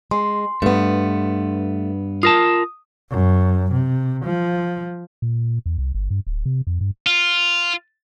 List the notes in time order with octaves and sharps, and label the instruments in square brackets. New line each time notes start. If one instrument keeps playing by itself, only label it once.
[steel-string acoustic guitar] G#3 [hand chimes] C6
[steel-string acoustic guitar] G2 B3 [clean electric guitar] A3
[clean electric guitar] F4 A#4 A5 [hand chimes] D#6
[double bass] F#2
C3
F3
[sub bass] A#2
E2
C2
G1
G2
D1
C3
F2
G2
[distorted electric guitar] F4